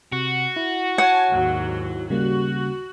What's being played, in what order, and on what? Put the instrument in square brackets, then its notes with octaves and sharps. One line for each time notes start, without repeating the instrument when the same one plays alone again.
[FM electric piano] C3 [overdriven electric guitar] F#4
[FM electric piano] E4
[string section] C#5 G#5 A5 [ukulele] F#5
[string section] D#2 G#2 F#3
[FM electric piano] C#3 G3 A#3 [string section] F#4